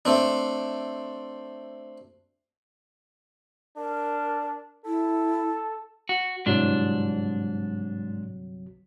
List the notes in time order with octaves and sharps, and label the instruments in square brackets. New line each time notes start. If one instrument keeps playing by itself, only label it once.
[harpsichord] A3 C4 D4
[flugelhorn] D4 [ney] A#4
[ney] E4 [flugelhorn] A4
[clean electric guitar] F#4
[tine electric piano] G1 C2 F#3 [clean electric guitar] G#2 D4